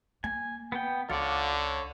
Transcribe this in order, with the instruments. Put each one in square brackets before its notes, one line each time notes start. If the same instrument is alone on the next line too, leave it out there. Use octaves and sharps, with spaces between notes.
[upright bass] A#3 [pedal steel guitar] G#5
[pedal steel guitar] B3 G5
[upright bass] C#2 [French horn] D3 [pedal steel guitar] F4 C#5 D5
[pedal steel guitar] C#5